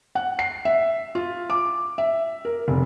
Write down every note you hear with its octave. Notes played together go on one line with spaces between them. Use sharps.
F#5
C7
E5
F4
D6
E5
A#4
F1